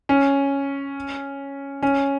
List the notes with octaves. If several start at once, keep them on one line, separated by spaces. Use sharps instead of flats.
C#4
C#4